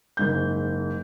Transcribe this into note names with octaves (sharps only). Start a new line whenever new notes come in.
F#1 G#2 G6